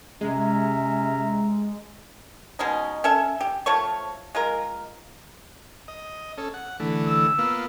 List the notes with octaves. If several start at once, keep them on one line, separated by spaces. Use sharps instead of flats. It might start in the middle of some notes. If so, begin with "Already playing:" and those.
C3 G#3 C#4 E5 A#5
B2 G#3 C#4 D#4
C#4 A4 E5
G4
F3 A3 C#5 C#6
G#3 F4 A#4
D#5
C#4 A4
F#5
D3 E3 A3
E6
A#3 B3 F4